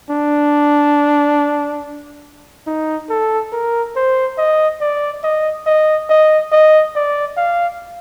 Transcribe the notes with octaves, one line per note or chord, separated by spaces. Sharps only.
D4
D#4
A4
A#4
C5
D#5
D5
D#5
D#5
D#5
D#5
D5
F5